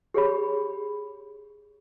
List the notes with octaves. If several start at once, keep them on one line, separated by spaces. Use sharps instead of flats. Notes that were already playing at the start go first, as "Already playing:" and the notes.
G4 G#4 C#5 B5